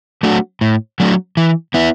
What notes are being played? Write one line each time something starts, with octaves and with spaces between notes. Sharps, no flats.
F#3 A3 D4 F#4
A2
F#3 A3 D4 F#4
E3
B3 E4